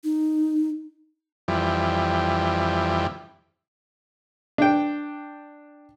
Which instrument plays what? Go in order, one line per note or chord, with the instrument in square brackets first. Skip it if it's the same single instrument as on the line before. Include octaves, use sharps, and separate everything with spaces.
[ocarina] D#4
[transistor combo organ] F2 E3 G3
[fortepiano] D4 G5